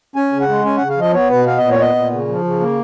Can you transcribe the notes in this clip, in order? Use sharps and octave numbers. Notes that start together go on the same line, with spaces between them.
C#4 G#5
C#3
F#5
G#3
C#4 G#5
C#3 F#5
F5
F3 D#5
B3 C#5
B2 B4
B3 F5
A#2 D#5
C#5
B3 D#5
A#2
C#3
F3
C#3
A#3